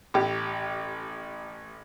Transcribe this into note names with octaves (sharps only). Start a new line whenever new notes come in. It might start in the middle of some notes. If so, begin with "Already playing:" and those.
A1 G4